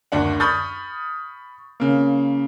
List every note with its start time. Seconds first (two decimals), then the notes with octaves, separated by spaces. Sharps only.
0.12 F#1 D2 D4 F#5
0.40 B5 C#6 D#6 F6 G6 A6
1.80 C#3 A#3